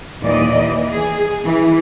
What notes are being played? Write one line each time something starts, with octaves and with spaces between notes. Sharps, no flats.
D#2 A#2 E3 A#3 D5 D#5
E3
G#4
E3